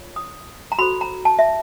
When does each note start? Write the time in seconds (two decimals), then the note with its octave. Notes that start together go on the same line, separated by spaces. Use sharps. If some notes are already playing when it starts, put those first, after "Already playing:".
Already playing: F4 A#4 C#5
0.16 D#6
0.72 A#5
0.78 F#4 A4 C5 B5
1.01 A#5
1.25 A5
1.39 E5